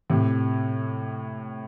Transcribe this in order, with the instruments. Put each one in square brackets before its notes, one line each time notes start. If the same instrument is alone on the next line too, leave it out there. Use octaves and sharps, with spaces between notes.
[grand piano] A2 C3